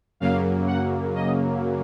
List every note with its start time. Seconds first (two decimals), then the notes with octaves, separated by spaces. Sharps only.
0.20 F#2 C#3 F#3 A#3 F5
0.67 F#5
1.15 D#5